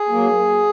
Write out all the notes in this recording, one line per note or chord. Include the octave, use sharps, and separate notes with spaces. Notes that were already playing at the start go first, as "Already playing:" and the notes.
Already playing: G#4
F#3 A#3